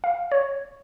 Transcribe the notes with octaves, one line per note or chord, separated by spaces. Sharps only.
F5
C#5